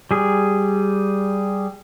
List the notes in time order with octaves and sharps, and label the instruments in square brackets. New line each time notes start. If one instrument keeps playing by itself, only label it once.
[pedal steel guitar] G3 G#4